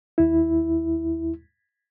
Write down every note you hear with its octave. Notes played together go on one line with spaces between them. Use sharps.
D#2 E4